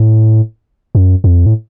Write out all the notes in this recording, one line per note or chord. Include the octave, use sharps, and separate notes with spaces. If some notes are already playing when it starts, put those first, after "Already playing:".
Already playing: A2
F#2
F2
A2